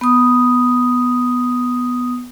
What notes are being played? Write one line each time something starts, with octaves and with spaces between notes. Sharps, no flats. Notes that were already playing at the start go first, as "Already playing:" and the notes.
B3 D#6